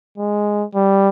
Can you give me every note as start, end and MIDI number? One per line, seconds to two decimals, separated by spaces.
0.18 0.65 56
0.75 1.09 55